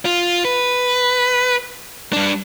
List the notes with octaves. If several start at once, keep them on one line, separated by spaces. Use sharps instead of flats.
F4
B4
G2 D4